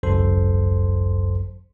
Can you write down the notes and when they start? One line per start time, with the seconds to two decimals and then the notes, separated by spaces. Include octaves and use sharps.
0.03 G#1 C#2 F#2 A4 C5 C6